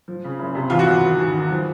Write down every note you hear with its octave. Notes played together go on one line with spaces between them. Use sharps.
F3
C#3
F#1
C3
E2 F4
F#4
E2
D#3
D#2
D#3
F3